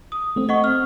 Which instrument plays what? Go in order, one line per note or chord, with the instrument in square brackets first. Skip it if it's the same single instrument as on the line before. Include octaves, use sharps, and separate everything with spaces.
[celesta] D#6
[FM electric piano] A3 C4
[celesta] D#5 F#5 C#6
F6